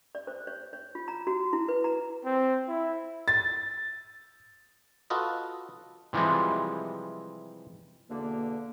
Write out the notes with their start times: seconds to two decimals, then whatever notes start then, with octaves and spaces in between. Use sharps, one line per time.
0.15 D5
0.27 C5
0.47 C#5
0.73 C#5
0.95 F4
1.08 A#5
1.27 F#4
1.53 E4
1.68 B4
1.84 A#5
2.25 C4
2.68 E4
3.28 A6
5.10 F4 F#4 A4 B4 D#5
6.13 C3 E3 F3 G3 G#3
8.10 E2 B2 D3 A#3